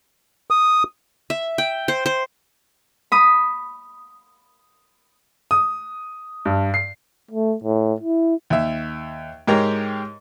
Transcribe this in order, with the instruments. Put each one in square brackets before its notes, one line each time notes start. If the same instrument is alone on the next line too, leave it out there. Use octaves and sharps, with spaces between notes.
[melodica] D#6
[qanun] E5
G5
C5
C5
[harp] B5 D#6
[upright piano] D#6
G2
C7
[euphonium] A3
A2
E4
[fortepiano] D#2 E5
G#2 G#3 G4 A#4 C#5 A#5